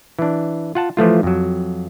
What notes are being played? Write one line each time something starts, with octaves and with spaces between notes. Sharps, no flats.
E3 D4
F4 F#5 A5
E3 F3 A3 F4
F2 F#3